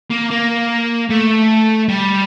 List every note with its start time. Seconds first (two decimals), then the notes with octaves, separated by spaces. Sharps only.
0.11 A#3
0.30 A#3
1.10 A3
1.89 G3